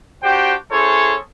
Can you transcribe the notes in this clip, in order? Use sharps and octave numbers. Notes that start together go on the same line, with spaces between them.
D4 F#4 G4 C5 G5
C#4 E4 G#4 A4 C5 C#5